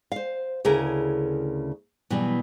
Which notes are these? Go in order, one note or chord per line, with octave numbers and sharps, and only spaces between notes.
C5 F5
D2 C#3 E4 G#4 A#4
B2 E3 F#3 G3